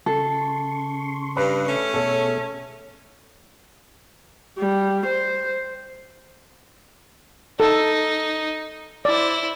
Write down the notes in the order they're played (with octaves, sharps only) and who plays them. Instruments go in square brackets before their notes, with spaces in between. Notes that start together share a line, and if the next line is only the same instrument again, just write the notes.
[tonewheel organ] C#3 C6 C#6 [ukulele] A4
[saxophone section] G2 [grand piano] B4
[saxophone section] A3 C#4
[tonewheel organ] B2 G#4 [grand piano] A4 C#5
[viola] G3
C5
[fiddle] D#4 [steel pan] A4
[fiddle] E4 C5 [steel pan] D5